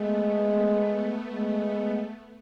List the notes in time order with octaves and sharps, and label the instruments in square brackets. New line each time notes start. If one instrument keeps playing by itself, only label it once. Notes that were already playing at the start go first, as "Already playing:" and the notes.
Already playing: [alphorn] G#3 [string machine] A3 B3
[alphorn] G#3